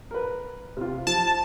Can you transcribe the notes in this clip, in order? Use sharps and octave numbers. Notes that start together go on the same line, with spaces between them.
A#4 B4
C3 F4
F3 A5